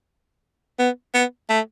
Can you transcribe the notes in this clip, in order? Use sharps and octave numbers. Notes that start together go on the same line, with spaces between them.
B3
B3
A3